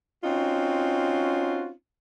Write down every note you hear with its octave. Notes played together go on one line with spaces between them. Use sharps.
C4 C#4 D#4 F4 F#4